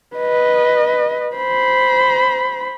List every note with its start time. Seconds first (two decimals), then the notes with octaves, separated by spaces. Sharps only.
0.16 B4 D#5
1.36 C5 B5